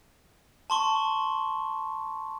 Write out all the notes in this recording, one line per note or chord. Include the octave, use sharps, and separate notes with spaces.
A5 C6 C#6